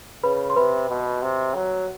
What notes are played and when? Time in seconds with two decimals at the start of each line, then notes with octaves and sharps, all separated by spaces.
0.24 C#3 B4 B5
0.50 C6
0.56 C3 B4 B5
0.89 B2
1.22 C3
1.55 F#3